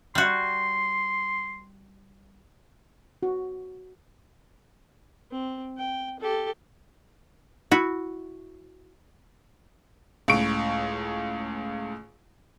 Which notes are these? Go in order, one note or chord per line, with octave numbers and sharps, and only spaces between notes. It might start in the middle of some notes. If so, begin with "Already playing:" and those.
G3 F#4 C6
F#4
C4
G5
G4 A4
E4 F#4
C#2 A2 C#6 D7